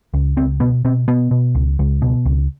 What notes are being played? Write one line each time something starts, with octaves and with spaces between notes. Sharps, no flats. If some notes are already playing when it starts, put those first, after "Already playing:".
C#2
C#2 C4
B2 B3
B2 C4
B2 B3
B2
C#2
C#2
B2
C#2